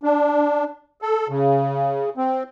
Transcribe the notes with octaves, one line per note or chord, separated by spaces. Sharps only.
D4
A4
C#3
C4